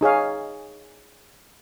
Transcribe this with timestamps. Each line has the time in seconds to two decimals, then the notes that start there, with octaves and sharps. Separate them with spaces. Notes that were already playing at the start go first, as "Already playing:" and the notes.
0.01 D#4 G#4 C#5 F5